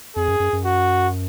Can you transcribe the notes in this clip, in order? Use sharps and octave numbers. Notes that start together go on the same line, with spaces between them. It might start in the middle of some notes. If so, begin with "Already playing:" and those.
F2 G#4
F#2
F#2
F#2
F#4